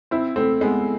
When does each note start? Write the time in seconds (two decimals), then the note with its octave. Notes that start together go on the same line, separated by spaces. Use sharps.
0.11 C4 E4
0.36 A3 C4
0.61 G#3 B3